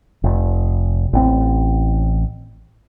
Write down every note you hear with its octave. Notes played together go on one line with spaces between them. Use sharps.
F1
A1 C4